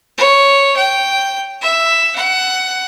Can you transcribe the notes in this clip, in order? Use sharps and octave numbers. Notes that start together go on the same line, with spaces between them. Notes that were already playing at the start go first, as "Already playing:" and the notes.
C#5
G5
E5
F#5